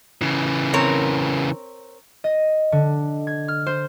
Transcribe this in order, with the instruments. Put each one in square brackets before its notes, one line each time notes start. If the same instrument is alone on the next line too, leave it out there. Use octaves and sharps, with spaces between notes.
[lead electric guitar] C#3 E3
[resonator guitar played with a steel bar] C4 A#4 C#5
[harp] D#5
D3
G#6
F6
C5